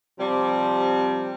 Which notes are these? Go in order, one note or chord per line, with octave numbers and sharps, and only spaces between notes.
C3 F3 G3